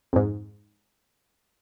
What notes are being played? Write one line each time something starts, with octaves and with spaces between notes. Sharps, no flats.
F2 G#2